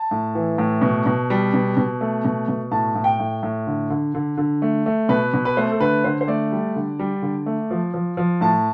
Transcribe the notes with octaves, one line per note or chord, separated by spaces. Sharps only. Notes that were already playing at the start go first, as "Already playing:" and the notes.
Already playing: A5
A2
E3
A2
B2
B2
G3
B2
B2
A3
B2
B2
A2 A5
A2
G5
A2
A2
D3
D3
D3
D3
A3
A3
B2 B4
B2
B4
A3 C5
A4
D3 B4
D3 C5
C5
A3 D5
G3
D3
G3
D3
A3
F3
F3
F3
A2 A5